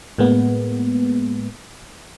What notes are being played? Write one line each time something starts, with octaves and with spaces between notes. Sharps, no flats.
A2 G#3 A#3 B3